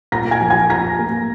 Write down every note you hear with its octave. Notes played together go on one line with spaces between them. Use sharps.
A#2 A#5 A#6
G#5 G#6
F3
G#5 G#6
F4 A#5 A#6
A#3